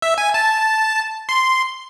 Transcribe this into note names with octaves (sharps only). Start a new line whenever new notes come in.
E5
G#5
A5
C6